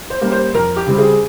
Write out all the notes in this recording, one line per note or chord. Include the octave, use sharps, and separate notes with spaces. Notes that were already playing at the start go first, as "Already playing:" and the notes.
C5
G3 A#3 C#4
C5
F2 A#4
G4
C#3 G3 C4
G#4